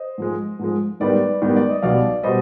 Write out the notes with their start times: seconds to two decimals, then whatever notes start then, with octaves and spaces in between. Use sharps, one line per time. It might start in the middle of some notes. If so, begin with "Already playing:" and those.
Already playing: C5 D#5
0.18 G#2 F3 G#3
0.59 G#2 F3 G#3
1.00 G#2 D#3 G3 B3 B4 D5
1.42 G#2 D#3 G3 B3
1.56 D5
1.70 D#5
1.82 B1 B2 G3 D5 F5
2.23 B2 G3 C5 D#5